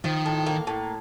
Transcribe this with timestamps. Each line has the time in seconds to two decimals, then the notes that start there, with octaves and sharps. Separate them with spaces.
0.04 D#3 F3
0.26 A2
0.46 A#3
0.67 A2